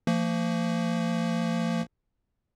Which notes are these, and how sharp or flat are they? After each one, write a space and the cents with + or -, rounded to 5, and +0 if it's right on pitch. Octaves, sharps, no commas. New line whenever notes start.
F3 -25 A#3 -40